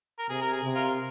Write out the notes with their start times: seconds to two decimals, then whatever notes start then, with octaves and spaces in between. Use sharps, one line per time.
0.18 A#4
0.29 C3 G#4
0.41 A#4
0.53 G#4
0.63 C3
0.74 F4 A#4